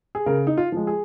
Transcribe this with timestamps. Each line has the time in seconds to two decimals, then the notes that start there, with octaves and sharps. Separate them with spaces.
0.15 G#4
0.26 C#3 A#4
0.47 D#4
0.57 F4
0.72 F3 G#3
0.87 G#4